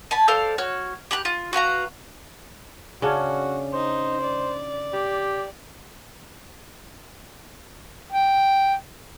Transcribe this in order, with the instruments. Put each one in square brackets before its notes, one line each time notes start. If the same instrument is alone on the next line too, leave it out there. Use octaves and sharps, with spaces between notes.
[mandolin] G#5 A5 B5
A4 C5 D5 F5
F#4 C#5 F6
G4 B5 F#6
F4
F#4 B4 F5 A#5
[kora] C#3 C#4 D4 [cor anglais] F#4
[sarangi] D#4 [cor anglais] C5
[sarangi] D5
[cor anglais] G4
[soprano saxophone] G5